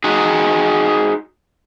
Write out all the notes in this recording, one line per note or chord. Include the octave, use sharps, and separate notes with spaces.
D#4 F#4 G#4